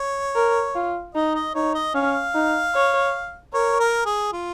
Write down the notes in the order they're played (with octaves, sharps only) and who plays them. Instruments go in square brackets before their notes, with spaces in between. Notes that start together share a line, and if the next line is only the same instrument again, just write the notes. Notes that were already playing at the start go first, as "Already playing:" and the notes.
Already playing: [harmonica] C#5
[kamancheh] A#4
F4
[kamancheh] D#4 [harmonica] D#5
[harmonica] D#5
[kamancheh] D#4 [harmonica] C#5
[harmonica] D#5
[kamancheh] C#4 [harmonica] F5
[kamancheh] D#4
C#5
[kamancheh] A#4 [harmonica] C#5
[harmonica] A#4
G#4
F4